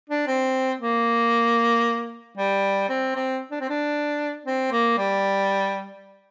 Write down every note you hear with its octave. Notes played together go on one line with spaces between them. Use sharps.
D4
C4
A#3
G3
C4
C4
D4
C4
D4
C4
A#3
G3